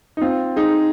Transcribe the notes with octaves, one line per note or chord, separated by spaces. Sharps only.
D#4
C4 F4
D#4 G#4